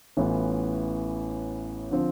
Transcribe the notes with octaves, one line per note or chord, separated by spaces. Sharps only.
A1 A2 E3 B3 F4
D3 F3 C4